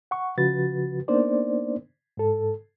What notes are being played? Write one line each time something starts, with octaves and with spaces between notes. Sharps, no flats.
F#5 C#6
C#3 F3 F#4 B4 A6
A#3 B3 D4 D#4 C5 D5
G#2 A4